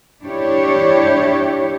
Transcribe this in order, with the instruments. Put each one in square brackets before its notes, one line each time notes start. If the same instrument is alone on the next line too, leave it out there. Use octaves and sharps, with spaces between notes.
[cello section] D4 E4 G4 C#5